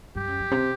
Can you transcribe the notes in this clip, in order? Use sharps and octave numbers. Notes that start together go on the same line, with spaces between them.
G2 G4
F#2
G2
C3